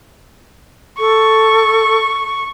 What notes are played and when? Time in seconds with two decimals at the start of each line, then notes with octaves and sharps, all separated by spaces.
0.99 A4 C#6